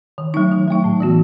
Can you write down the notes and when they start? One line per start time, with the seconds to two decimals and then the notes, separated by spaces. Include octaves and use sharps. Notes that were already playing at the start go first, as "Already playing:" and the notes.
0.18 D#3
0.34 F#3 A3 D#4
0.51 D#3
0.68 F#3 A3 D#4
0.84 A2
1.00 E3 B3 F#4